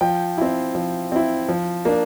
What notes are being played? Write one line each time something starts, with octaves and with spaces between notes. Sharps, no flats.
F3 G5
C4 E4
F3
C4 E4
F3
A#3 D4